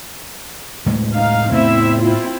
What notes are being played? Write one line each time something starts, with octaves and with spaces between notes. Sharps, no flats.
A2 F#3 G#3
D#4 F5
A2 B3 C4 E4 E5
C4 E4 F4